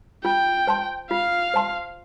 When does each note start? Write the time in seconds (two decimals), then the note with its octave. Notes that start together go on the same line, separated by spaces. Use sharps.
0.24 F4 G5
0.67 C5 A5 C6
1.11 F4 F5
1.54 C5 A5 C6